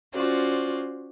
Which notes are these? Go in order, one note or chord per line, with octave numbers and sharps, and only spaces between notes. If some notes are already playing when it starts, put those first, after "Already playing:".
C#4 F4 F#4 C5 D5